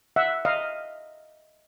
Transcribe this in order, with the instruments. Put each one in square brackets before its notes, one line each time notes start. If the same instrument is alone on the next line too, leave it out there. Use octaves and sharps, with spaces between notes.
[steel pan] E5 F#5
D#5 F5